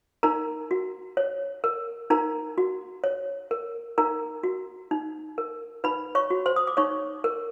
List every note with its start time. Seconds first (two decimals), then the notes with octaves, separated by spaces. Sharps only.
0.23 D#4 A#4 A#5
0.71 F#4
1.17 C#5
1.64 A#4
2.10 D#4 A#4 A#5
2.58 F#4
3.04 C#5
3.51 A#4
3.98 D#4 A#4 A#5
4.43 F#4
4.91 D#4
5.38 A#4
5.84 D#4 B4 B5
6.15 C#5 C#6
6.30 F#4
6.46 C5 C6
6.56 D#6
6.67 D6
6.77 D#4 C#5 C#6
7.24 A#4